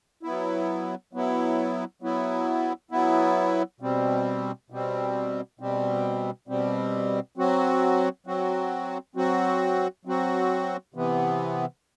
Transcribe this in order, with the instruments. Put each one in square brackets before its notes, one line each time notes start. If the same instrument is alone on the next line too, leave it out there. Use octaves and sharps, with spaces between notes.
[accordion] F#3 B3 E4
F#3 B3 E4
F#3 B3 E4
F#3 B3 E4
B2 G3 C4
B2 G3 C4
B2 G3 C4
B2 G3 C4
F#3 C4 F#4
F#3 C4 F#4
F#3 C4 F#4
F#3 C4 F#4
C3 E3 B3